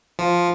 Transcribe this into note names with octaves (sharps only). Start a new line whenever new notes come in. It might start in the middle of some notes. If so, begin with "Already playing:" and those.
F3